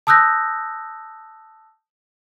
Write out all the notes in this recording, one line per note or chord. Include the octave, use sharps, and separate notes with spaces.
A5 D#6 E6 F#6 G6 A#6